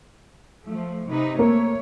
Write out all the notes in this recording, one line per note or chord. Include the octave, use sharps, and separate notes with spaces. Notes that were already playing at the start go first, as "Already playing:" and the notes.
F3 A3
C3 D#4 B4
A3 A#3 C#5